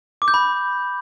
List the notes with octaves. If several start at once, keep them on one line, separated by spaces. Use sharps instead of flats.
D6
G6
B5